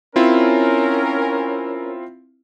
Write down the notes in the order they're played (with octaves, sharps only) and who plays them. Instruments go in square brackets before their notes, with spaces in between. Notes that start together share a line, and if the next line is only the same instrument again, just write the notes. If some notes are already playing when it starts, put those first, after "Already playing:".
[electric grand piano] C4 E4 F4 [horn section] C#4 A#4